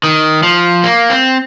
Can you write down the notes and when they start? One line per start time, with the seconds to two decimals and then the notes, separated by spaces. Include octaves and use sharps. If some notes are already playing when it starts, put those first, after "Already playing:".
0.04 D#3
0.43 F3
0.84 A#3
1.10 C4